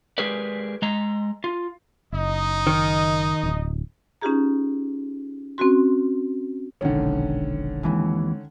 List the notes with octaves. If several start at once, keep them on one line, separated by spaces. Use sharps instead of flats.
G#3 G4 G#4 A#4 B4 D5
G#3 D#5 A#5
F4
F#1 D#4 D#5
D#3
D1
C#4 D#4 F4 G4 G#4 A#5
C4 C#4 F#4 C6
E1 A#1 D3 D#3 C#4
D#2 E3 G#3 C4